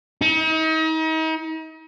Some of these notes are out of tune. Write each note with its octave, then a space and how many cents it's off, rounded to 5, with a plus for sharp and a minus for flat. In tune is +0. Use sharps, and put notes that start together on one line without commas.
D#4 +40